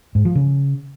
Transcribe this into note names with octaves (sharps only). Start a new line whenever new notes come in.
G#2
F3
C#3